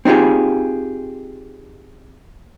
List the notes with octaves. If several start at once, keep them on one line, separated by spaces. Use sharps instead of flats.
C4 D#4 F4 G4 G#4